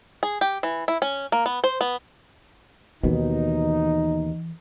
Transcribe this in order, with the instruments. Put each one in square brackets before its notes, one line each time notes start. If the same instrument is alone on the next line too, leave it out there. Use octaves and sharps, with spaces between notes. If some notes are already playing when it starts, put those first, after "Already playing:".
[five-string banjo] G#4
G4
E3
E4
C#4
A#3
B3
C5
B3
[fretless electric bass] D#2 B2 [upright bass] E3 [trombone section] D#4